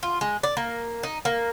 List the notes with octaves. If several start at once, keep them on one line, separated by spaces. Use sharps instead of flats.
F4
G#3
D5
A#3
D#4
A#3